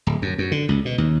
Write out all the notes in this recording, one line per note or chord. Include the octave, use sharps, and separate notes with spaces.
D1
F#2
F#2
D3
C#2
B2
D#2